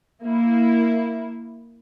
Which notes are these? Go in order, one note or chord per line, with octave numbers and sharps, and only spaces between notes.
A#3 E4